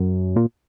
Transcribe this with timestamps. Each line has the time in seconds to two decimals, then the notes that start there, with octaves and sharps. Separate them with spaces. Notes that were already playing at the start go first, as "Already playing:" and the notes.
Already playing: F#2
0.36 A#2